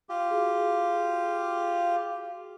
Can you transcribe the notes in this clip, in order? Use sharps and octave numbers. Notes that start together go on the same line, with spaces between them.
F4 G4
F#4 G#4